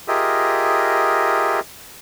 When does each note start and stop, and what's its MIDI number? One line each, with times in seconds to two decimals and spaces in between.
0.08 1.60 65
0.08 1.60 67
0.08 1.60 68
0.08 1.60 70
0.08 1.60 75
0.08 1.60 76